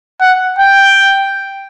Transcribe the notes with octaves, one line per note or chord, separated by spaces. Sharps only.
F#5
G5